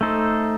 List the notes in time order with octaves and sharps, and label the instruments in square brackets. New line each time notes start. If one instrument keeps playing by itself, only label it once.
[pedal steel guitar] A3 D#4 A4 C5